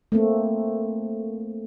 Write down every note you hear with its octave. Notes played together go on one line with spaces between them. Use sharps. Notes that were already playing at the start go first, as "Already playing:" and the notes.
A3 A#3 C4